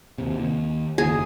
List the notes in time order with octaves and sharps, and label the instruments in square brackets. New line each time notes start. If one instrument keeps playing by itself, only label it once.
[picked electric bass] D#2 C3
D#2
[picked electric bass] F#1 D#2 [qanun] G#4